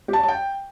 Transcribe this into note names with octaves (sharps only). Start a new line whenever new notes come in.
G4
A5
C#5
A5
G5